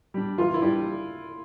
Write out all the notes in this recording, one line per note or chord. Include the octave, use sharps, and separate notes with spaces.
G3 D4
E3 F4
E4
G3 D4 G4 D5